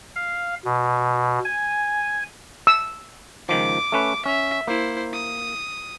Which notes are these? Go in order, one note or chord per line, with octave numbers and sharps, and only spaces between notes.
F5
B2
G#5
E6
C#2 D#3 F3 D6
A3 C#4 B4
C#4 E5
A#3 E4 C5
D#6